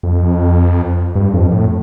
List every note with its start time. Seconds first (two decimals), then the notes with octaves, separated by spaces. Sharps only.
0.03 F2
1.15 G2
1.34 F2
1.52 A2